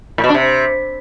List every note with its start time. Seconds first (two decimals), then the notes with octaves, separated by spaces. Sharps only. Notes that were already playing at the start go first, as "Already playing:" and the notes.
0.18 A2
0.24 B2
0.29 D4
0.34 C3